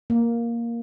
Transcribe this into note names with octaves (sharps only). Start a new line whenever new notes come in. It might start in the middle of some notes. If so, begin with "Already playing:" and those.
A#3